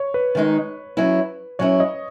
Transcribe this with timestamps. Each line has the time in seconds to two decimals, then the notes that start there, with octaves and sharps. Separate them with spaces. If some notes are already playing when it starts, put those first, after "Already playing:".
Already playing: C#5
0.14 B4
0.35 D#3 G#3 D#4
0.97 F#3 C#4 E4
1.59 F#3 C#4 E4 C#5
1.80 D#5